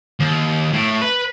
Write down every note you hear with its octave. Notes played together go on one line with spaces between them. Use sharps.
D#2
A2
B4